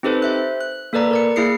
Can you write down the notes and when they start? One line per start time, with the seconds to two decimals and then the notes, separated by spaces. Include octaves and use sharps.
0.03 C4 D#4 G4 A4 B4 C5
0.22 C5 E5 F#6
0.60 F#6
0.93 A#3 A4 B4 D5 A#5
1.11 A#4 D5 C#7
1.36 A#3 E4 G#4 C7 C#7